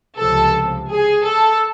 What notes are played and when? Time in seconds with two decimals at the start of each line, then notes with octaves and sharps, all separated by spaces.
0.18 C#2 C3 F3 A4
0.89 G#4
1.24 A4